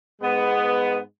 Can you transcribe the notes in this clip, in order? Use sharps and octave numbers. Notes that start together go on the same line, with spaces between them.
G#2 G#3 B3